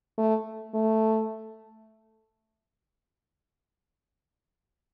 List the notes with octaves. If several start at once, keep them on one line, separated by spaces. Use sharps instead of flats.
A3
A3